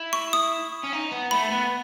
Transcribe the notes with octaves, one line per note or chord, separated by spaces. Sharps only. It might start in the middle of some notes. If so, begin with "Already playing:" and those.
Already playing: E4
C#6
D#6
C#4
D#4
B3
A3 B5
B3